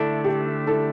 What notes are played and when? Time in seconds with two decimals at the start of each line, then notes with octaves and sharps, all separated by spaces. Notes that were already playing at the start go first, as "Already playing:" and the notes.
Already playing: D3 A3 D4 E4 A4
0.24 G4
0.67 E4 A4